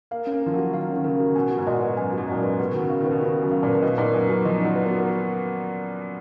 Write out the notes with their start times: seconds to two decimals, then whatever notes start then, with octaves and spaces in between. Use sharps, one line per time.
0.11 A#3 F5
0.27 A#3 C#4
0.43 F3 A#4
0.54 F#3 F#4
0.73 D#3 F5
0.89 C#4
0.95 D#3
1.04 C#3 A#4
1.20 F#4
1.35 B2 G#5
1.51 F#4
1.58 G#2
1.67 A#2 D#5
1.82 B4
1.97 F#2 G#5
2.13 F#2 F#4
2.28 A#2 D#5
2.39 G#2 B4
2.59 B2 F#4
2.71 D#3
2.75 C#3 F#4
2.90 F5
3.00 D#3
3.06 B2 B4
3.21 C#3 F#4
3.37 F#2 F#4
3.52 F5
3.63 A#2
3.68 B4
3.75 A#2
3.82 B2 D#5
3.98 A#2 D#4
4.14 F#2 B4
4.29 F#2 F#4
4.45 F3 D#5
4.60 F#3 D#4
4.76 B4
4.86 B3
4.91 F#4